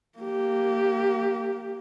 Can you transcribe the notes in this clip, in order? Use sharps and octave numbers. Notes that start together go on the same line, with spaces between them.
A#3 G4